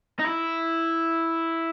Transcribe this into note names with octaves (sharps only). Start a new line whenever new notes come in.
D#4
E4